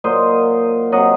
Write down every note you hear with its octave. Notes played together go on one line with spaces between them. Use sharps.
A#2 F#3 C5 D#5
C3 F#3 D#5 F#5